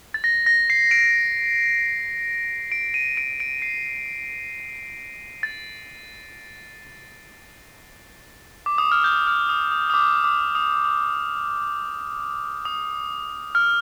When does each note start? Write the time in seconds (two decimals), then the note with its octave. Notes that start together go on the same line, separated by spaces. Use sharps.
0.14 A6
0.24 A#6
0.46 A#6
0.70 C7
0.91 D7
2.72 D7
2.94 D#7
3.17 D7
3.40 D7
3.62 C7
5.43 A6
8.66 D6
8.78 D#6
8.92 F6
9.04 G6
9.27 F6
9.49 D#6
9.72 D#6
9.90 D#6
9.94 D6
10.24 D6
10.55 D#6
10.85 D#6
12.65 D#6
13.55 F6